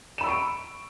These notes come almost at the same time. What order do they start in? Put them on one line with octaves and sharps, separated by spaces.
E7 B5 E6 C#6 D7